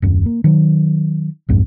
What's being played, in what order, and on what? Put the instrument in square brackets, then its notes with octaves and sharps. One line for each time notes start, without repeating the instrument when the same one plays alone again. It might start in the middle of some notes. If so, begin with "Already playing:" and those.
[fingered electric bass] D#1 F#2
A#3
D#3 F#3
B1 F2 G#2